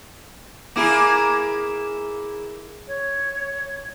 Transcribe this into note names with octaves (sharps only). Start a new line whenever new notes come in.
A#3 E4 G#4
C#5